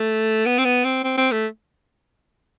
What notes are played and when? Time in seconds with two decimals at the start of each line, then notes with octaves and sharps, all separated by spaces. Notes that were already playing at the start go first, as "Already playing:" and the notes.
Already playing: A3
0.46 B3
0.59 C4
0.65 B3
0.85 C4
1.04 C4
1.18 C4
1.32 A3